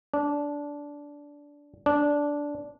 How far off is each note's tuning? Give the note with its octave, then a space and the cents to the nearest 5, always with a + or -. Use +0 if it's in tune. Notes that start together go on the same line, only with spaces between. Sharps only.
D4 -15
D4 -10